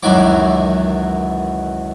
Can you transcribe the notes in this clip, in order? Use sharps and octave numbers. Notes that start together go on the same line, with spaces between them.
C#2 F#2 D#3 E3 F#3 D6